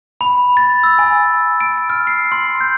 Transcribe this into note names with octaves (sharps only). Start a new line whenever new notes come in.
B5
A6
E6
G#5
D7
F6
C7
C6
G6